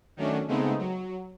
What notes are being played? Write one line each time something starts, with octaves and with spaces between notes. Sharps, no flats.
D#3 F#3 A3 C#4 D4
C#3 G#3 A3 B3 C4 D#4
F#3